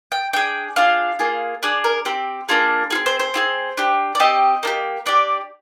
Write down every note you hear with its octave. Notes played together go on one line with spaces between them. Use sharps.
G5
D4 G#4 G5
D4 F4 G#4 F5
A#3 F4 G#4
D4 G#4 D5
A#4
C4 G4
A#3 D4 F4 G#4
C4 F4 G#4
C5
C5
C4 F4 G#4
D4 G4
D5
C4 G4 D#5
A#3 D4 G4
D4 G4 D5